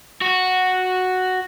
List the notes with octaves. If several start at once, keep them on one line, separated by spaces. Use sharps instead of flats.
F#4